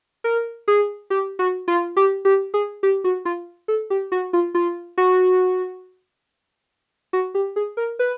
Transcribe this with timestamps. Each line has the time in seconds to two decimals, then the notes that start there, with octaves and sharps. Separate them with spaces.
0.24 A#4
0.68 G#4
1.10 G4
1.39 F#4
1.68 F4
1.97 G4
2.25 G4
2.54 G#4
2.83 G4
3.04 F#4
3.25 F4
3.68 A4
3.90 G4
4.12 F#4
4.33 F4
4.55 F4
4.98 F#4
7.13 F#4
7.35 G4
7.56 G#4
7.77 A#4
7.99 B4